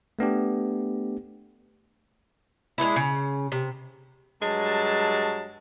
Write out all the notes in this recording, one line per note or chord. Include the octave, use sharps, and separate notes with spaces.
A3 B3 D4 G4
G#3 A3 D4 E4
C#3
C3
G2 F#3 G#3 A5